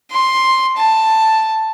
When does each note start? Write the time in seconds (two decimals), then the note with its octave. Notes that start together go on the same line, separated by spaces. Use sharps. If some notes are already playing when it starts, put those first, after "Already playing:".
0.12 C6
0.77 A5